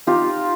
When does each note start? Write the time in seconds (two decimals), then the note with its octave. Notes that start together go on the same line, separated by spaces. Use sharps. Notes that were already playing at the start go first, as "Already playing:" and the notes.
0.07 D#4 F4 G4